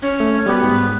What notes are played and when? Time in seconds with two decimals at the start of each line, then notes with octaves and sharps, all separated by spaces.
0.02 C#4
0.20 A3
0.46 G3 B3 F#4 G4
0.63 G#2